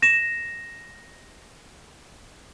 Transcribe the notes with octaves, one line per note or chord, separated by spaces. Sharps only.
A#6 E7